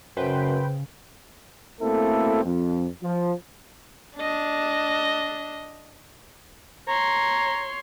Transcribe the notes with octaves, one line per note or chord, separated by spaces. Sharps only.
F#2 C#3 B4 C5 G5
B2 A3 A#3 C4 E4 A4
F2
F3
D4 D#5
C#5 A#5 C6